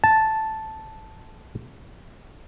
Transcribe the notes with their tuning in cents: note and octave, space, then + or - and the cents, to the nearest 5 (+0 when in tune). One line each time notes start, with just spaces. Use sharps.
A5 -5